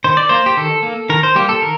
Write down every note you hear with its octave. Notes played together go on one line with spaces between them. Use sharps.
D#3 C5
D5
A#3 C5
G4
D#3 A4
A#3
D#3 A#4
C5
G3 A#3 G4
A4
D#3 A#4